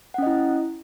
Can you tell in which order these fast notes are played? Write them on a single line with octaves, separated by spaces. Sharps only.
F#5 C#4 D#5 E4